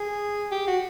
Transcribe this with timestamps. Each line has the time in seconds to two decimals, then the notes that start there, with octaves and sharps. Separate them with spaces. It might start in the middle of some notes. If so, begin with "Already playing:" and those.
Already playing: G#4
0.51 G4
0.67 F#4